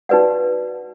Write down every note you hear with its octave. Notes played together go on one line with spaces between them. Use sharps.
D#4 F#4 B4 D5 F#5